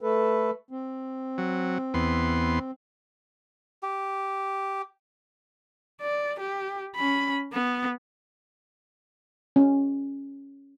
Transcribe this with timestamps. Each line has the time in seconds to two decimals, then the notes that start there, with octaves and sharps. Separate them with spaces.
0.01 A3 A4 B4
0.71 C4
1.38 F#3
1.94 E2 B3 C6
3.83 G4
6.01 D5
6.40 G4
6.96 C#4 B5
7.53 B3
9.56 C#4